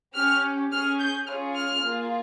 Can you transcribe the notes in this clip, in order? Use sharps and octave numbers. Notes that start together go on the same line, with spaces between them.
C#4 G4 F6
C#4 G#4 F6
G6
C#4 F4 G#4 F6
F6
A#3 F4 G#4